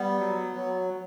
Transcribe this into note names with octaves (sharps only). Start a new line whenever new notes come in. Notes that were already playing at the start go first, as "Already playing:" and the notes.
Already playing: G3 B3
F#3
F#3